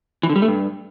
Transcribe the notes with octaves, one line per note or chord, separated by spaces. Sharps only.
E3
D3
G3
A3
G2